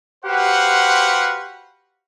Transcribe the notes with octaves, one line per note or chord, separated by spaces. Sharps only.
F#4 G4 B4 C5 F5 F#5